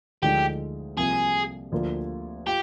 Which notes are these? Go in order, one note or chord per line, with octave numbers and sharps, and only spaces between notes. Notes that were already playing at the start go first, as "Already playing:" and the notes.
D2 D3 F3 G#3 D#4 G4
C2 C3 F3 A#3 G#4
D2 D3 F3 A#3 F4
F4 G4